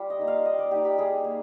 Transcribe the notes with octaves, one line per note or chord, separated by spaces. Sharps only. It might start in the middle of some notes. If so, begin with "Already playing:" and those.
Already playing: G3 F4 G4
D#5
A#3 D#4
F5
G3 D#5
D5
A#3 D#4 G4
G4
G3 G#4
A#3